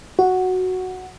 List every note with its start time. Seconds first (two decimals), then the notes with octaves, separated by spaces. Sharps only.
0.19 F#4